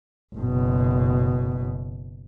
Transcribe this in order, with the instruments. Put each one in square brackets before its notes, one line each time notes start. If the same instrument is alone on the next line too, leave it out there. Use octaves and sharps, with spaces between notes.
[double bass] F#1 B2